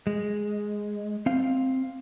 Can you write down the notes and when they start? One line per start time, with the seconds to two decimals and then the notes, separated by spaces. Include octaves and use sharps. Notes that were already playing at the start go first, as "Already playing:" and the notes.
0.07 G#3
1.26 C4 F5